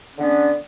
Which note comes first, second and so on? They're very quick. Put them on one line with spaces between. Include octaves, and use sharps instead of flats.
C#4 D3 B3